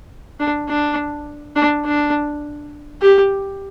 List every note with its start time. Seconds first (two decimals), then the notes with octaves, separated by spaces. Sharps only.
0.40 D4
0.69 D4
1.56 D4
1.85 D4
3.02 G4